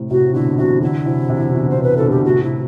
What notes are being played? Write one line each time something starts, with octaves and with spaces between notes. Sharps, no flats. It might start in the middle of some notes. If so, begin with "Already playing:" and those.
Already playing: A2 C3
A2 C3 F#4
B2 D3 E4
C3 E3 F#4
D3 F#3 E4
C3 E3
C3 E3
B2 D3
C5
B2 D3
B4
B2 D3 A4
G4
A2 C3 F#4
E4